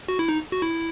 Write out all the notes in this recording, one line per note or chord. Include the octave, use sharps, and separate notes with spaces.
F#4
E4
D#4
F#4
E4